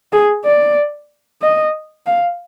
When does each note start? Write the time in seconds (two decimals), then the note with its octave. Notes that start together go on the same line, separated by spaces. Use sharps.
0.13 G#4
0.45 D5
1.42 D#5
2.06 F5